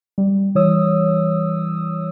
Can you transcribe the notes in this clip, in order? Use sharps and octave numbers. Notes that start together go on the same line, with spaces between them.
G3
E3 G3 C#5 D#6 E6